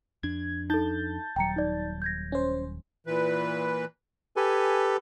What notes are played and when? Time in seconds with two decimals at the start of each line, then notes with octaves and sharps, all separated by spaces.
0.23 F2 D4 G#6
0.70 D#4 A4 A5 G6 A6
1.36 D#1 F#3 G5 A#5 C#7
1.56 D#4 D5
2.02 G6 G#6 A#6
2.32 C#4 C5
3.07 A#2 E3 B4
4.36 G4 A4 B4 G#5